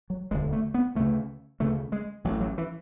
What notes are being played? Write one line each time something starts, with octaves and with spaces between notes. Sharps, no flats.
F#3
E1 D2 D3 G#3
A3
B3
D2 C#3 A3
D2 C#3 A3
G#3
A1 A2 F#3
F#3
E3